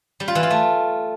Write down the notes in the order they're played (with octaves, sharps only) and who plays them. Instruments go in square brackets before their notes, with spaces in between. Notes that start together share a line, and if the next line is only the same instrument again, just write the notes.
[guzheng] G3
F4
E3
F4
A3